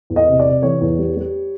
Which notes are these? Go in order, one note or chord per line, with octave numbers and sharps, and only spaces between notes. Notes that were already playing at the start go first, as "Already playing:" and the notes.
E2
D#5
C3
D5
C3
E3 C#5
E2
G3
G3